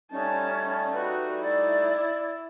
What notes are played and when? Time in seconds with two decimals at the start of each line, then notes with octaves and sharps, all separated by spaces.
0.12 G3 A3 C#4 D#4 A5
0.93 F#4 B4
1.42 E4 D5